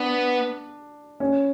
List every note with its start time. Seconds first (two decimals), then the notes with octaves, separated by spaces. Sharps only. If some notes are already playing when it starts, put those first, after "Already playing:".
Already playing: B3 D4
1.20 C#4